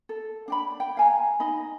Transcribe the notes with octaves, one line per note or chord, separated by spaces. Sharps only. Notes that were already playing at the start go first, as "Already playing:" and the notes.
A4
D4 G5 B5
G5
F5 G#5 A#5
D#4 D#5 B5